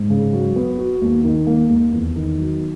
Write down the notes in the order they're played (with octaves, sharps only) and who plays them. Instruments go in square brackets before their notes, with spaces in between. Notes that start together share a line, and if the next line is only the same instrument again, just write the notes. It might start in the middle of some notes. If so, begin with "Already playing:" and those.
Already playing: [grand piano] G#2
C#3
F#3
B3
F#4
D#2
D#3
A#3
D#2
E2
D#3
F#3